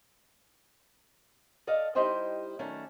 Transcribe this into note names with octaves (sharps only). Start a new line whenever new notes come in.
A4 D5 D#5 F5
G3 D#4 E4 C5 D#5 G5
D#3 F#3 A3 C#4 D4